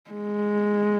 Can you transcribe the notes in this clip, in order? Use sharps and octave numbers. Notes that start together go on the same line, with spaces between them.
G#3